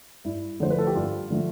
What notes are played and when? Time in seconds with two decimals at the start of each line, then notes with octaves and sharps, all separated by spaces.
0.24 G2 E4
0.60 D3 F3 A3 C5
0.70 B4
0.79 A4
0.87 G4
0.95 G2 F4
1.30 D3 F3 A3